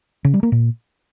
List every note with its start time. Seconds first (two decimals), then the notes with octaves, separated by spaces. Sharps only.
0.25 C#3
0.34 G3
0.43 A#3
0.52 A#2